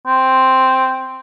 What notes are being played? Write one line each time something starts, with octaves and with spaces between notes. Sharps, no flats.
C4